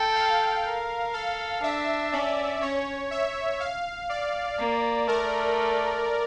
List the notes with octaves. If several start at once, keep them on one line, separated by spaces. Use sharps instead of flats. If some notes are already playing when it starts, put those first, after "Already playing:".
Already playing: A4 G5
F5
A#4
A4 F5
D4 E5
C#4 D5
C#4 C#5
E5
F5
D5
A#3
A3 A#4